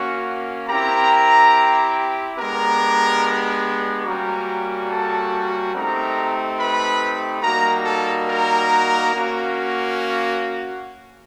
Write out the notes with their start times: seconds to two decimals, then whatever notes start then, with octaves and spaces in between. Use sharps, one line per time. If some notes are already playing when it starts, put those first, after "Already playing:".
Already playing: A#3 C#4 F#4
0.68 C4 E4 G4 A#4 A#5
2.37 G#3 B3 D4 G4 A#4 A#5
4.05 G3 A#3 C#4 F#4 A#4 A#5
4.89 A4 A5
5.74 A3 C4 D#4 G4 A#4 A#5
6.58 B4 B5
7.41 G3 A#3 D#4 F#4 A#4 A#5
7.83 A4 A5
8.26 A#4 A#5
9.11 A#3 C#4 F#4